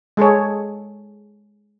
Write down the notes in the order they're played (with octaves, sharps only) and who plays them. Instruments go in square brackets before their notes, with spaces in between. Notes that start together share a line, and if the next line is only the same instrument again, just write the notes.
[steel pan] G#3 G#4 A4 C#5